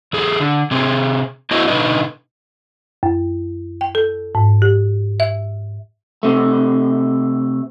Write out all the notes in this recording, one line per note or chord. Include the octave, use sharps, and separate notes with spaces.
E2 G#4 A4
D3
C3 C4 G#4
A3 B3 E4 F#4 C5 D#5
B2 D3 F3 D#4 B4 D#5
F#2
G5
A4
G#2
G4
E5
C3 A3